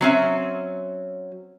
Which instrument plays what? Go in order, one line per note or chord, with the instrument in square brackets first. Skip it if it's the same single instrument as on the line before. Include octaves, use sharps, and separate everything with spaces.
[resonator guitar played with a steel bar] F#3 C4 C#4 E5